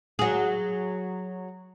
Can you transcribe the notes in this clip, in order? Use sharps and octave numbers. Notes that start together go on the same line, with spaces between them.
F#3 G#4